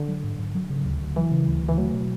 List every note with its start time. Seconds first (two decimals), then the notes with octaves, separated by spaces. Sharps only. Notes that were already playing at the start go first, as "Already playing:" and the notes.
Already playing: D3
0.08 F#3
0.24 G#2
0.39 G#2
0.55 F#3
0.70 C#3
0.85 D2
1.00 D2
1.16 E3 F#3
1.32 C#3
1.48 D2
1.63 D2
1.69 E3
1.78 F#3 A3
1.94 B2